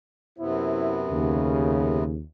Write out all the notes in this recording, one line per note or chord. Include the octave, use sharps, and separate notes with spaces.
F#2 C3 B3 E4 C5
D#2 C#3